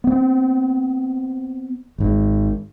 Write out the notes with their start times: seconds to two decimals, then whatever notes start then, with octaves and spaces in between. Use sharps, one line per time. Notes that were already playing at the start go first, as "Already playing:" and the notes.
0.04 B3 C4
1.98 G#1 G#2